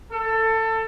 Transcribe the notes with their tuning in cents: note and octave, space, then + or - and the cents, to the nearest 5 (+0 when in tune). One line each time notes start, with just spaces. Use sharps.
A4 +20